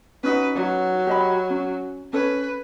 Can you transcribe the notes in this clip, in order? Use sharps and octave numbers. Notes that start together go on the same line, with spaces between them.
C#4 D#4 F#4 B4
F#3
G4 D#5 B5
C#4
C#4 A4 B4 C#5